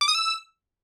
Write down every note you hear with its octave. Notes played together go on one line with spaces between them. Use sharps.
D6
D#6
E6